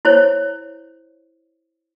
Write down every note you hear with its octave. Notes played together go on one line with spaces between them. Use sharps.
E4 C5 C#5